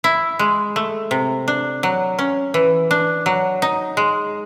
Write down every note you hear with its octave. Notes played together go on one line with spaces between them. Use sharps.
E4
G#3
A3
C3
D4
F#3
C#4
E3
D4
F#3
D#4
G#3